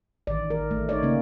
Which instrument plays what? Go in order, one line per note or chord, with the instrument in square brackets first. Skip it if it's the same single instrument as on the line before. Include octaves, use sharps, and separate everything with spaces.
[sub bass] A1 [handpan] D#3 D5
[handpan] A#4
[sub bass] A1 [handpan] A3
[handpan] D#4 C#5 D5
[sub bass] C#3 [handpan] A#3 C#4